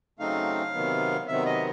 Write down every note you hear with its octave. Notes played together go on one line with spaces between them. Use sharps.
C#3 F#3 A3 C4 D#4 F5
C3 D#3 F#3 B3
C3 D#3 F#3 B3 E5
D#5